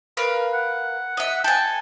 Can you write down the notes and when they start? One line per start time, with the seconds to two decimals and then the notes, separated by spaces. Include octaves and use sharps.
0.17 A#4 B4 F5
0.54 F#5
1.17 D#5 E5
1.44 A4 G5 G#5